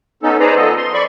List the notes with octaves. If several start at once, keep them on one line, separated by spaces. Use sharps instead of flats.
B3 C#4 D#4 A4
D#4 G#4 B4 C5 D5 A#5
F3 B3 A4 D#5
C6
D5 B5 C#6